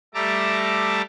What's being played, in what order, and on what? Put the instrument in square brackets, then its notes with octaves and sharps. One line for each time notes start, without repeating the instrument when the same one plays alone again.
[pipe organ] G3 A3 E5 A5 A#5 D6